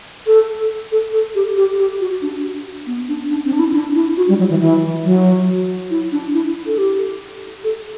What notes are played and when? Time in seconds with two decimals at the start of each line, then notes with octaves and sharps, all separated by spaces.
0.27 A4
0.92 A4
1.13 A4
1.35 G4
1.57 G4
1.79 G4
2.01 F#4
2.22 D4
2.87 B3
3.09 D4
3.30 D4
3.45 C4
3.53 D4
3.59 E4
3.73 D4
3.95 E4
4.17 F#4
4.29 G3
4.39 F#3
4.50 E3
4.60 E3
5.04 F#3
5.91 E4
6.12 D4
6.34 E4
6.67 A4
6.78 G4
7.64 A4